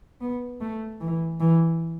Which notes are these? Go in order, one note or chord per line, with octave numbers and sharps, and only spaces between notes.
B3
A3
E3
E3